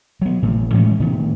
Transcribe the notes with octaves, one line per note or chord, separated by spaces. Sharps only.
F#3 B3
A1 A2
E3 G#3 A3 C#4
A2 D#3 B3